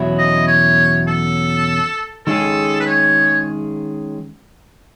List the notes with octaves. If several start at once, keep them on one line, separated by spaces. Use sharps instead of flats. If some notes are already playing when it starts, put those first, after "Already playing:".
Already playing: E2 B2 F#3 C#4 E4
D#5
C#5
A4
D#3 G#3 C#4 G#4 A4
B4
C#5